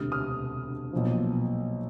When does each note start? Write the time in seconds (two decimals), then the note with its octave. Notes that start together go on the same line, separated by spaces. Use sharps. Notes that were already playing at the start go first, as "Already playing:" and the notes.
Already playing: E1 D2 C3 D#6 F6
0.12 D#6 F6
0.93 B1 A#2 F3